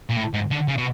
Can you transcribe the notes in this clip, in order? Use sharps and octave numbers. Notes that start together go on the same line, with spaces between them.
A#2
A2
G#2
D3
C#3
B2